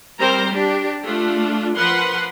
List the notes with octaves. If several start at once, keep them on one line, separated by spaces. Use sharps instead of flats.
G3 C4 A#4 C5 A#5
D4 G4
A3 D4 F4
F3 A#4 B4 F#5 C6